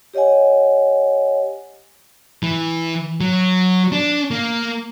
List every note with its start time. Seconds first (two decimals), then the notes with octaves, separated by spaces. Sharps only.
0.14 G4 C#5 D#5 F#5 G#5
2.43 E3
3.21 F#3
3.92 D4
4.31 A#3